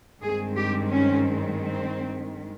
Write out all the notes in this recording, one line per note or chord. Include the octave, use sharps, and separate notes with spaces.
G2 D#3 G#3 C4 G#4
G4
C#4
C4